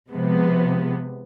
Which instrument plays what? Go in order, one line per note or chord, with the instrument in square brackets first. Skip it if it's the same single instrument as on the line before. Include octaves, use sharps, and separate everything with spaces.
[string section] C3 F3 G#3 B3